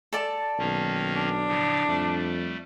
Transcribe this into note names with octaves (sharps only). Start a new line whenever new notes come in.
A4 D5 A5
B1 D#3 A#3 C#4
D4
A2 C#3 F3
F2 G3 A3